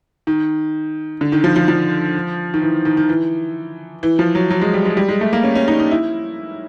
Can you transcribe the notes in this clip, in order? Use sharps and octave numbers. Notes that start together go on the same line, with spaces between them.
D#3
D3
D#3
F3
F3
F3
D#3
E3
D#3
D#3
E3
E3
F3
F#3
F#3
G#3
G3
G#3
G3
G#3
A3
A#3
C#4
C#4
D#4
D#4
E4